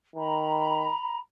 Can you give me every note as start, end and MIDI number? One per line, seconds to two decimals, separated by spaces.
0.16 0.89 51
0.16 1.17 82
0.16 1.17 83